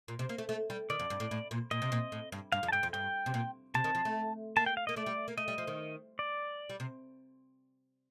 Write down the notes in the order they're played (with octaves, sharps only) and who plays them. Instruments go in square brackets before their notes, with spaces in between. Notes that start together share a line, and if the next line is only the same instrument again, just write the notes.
[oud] A#2
C3
A#3
A3
A3
G3
[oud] D#3 [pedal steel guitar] D5
[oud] F2
G2
A2
A2
A#2
[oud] A#2 [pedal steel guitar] D#5
[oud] C3
A#2
A2
G2
[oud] G2 [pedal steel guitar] F5
[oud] F2
[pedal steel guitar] A5
[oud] G2 [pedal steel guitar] G5
[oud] F2
[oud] G2 [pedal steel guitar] G5
[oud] C3
A#2
[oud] C3 [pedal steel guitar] A5
[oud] D#3
F3
A3
[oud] A#3 [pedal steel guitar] A5
[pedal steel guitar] G5
F5
[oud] A#3 [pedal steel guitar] D#5
[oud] A3 [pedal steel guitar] D5
[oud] G3
A#3
[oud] A3 [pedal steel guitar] D#5
[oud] G3
F3
D#3
[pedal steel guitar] D5
[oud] G3
C3